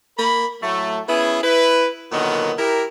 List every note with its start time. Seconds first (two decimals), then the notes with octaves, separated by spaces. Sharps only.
0.18 A#3 A#4 B5
0.62 A2 F#3 A3
1.08 B3 C#4 E4 G#4
1.43 E4 B4
2.12 A#2 D3 D#3 F#3 B3
2.58 E4 G4 A#4